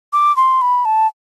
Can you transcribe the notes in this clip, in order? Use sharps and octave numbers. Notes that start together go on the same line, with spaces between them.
D6
C6
B5
A5